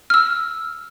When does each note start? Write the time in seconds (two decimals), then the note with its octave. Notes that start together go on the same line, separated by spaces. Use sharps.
0.10 E6 F6